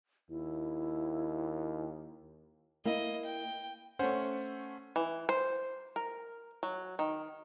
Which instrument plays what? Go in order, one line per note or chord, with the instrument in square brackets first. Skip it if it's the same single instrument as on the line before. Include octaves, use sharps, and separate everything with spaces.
[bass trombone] D#2 [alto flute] E4
[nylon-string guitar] A#3 E4 [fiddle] D#5
[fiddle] G5
[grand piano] A3 C#4 [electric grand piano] C5 F#5
[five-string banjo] E3
C5
A#4
F#3
D#3